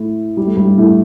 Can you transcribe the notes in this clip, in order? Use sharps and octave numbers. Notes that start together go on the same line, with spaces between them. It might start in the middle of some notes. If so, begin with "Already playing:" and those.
Already playing: A2 A3
G3
A3
G2 G3
A2 A3